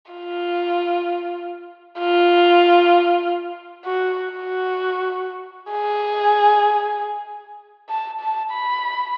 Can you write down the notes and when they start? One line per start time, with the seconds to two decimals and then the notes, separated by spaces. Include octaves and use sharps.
0.12 F4
1.99 F4
3.85 F#4
4.33 F#4
5.72 G#4
7.89 A5
8.21 A5
8.52 B5